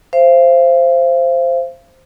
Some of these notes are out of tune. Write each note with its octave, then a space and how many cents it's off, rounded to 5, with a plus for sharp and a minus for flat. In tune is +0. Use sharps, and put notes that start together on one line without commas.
C5 +0 F5 -40